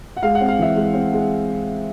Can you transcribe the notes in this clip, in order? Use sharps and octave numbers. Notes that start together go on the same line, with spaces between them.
F#5
G#3 F5
F#5
C4
F5
E3 E5
G#3
C4
G#3